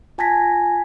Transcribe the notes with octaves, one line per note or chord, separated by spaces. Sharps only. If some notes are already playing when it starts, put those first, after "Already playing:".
F4 G#5 A5 G#6 A#6 B6